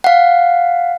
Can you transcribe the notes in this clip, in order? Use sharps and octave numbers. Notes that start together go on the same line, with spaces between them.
F5 F#5